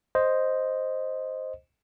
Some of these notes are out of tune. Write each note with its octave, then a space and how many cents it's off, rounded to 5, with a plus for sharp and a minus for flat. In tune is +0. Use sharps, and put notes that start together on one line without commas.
C5 +0 D#5 +0